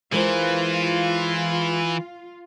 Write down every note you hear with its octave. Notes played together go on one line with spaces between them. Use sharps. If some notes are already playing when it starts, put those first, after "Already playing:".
E3 G#3 F4 A#4 C5